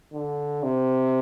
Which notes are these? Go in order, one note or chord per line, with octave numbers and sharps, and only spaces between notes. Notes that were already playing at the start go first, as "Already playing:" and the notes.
D3
C3